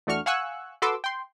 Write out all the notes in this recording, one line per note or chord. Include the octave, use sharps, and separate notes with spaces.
E2 A3 D4 F#4 C#6 F6
F5 F#5 G#5 C#6 E6 F#6
F#4 A4 B4 C6 D6 E6
G5 C6